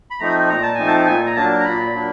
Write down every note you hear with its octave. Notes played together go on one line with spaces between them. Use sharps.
B5
F3 A3 C4 D#4 A#5
A#2 A#5
A5
F3 A3 C4 D#4 G#5
A5
A#2 G#5
A#5
F#3 A#3 D4 A5
A#5
A#2 B5
F#3 A#3 D4